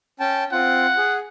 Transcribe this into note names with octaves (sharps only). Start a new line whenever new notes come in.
C#4 G5 A5
C4 F4 F#5
G#4